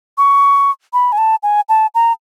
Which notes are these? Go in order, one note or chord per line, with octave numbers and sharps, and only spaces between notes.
C#6
B5
G#5
A5
G#5
A5
A#5